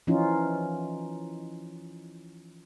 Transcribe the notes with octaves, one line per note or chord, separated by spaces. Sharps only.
E3 F3 C#4 D#4 F4